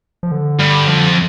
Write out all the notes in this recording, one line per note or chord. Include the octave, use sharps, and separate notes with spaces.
F3
D3
G2
F2